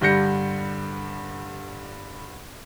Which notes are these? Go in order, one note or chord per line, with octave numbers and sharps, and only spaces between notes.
G2 D3 G3 G6 A#6 C#7